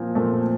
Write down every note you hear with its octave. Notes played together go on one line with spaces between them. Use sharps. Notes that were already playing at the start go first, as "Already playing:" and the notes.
Already playing: A#2 F3 C4
A#2 F3 A3 C4